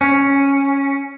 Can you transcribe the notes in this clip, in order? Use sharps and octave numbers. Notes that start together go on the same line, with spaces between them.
C#4